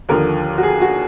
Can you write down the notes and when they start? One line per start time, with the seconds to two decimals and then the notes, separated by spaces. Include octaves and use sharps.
0.09 D#2 D3 F3 A#4
0.58 F#4
0.63 G#4
0.82 F#4